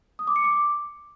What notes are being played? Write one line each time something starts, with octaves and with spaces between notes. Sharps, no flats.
D#6
D6
C#7
D6